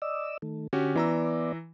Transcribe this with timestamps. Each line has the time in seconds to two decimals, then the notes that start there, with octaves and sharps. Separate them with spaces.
0.02 D5 D#5 E6
0.42 D#3 A3
0.73 D3 C#4 F#4 G4
0.96 E3 B3 E4 D5 A#5 E6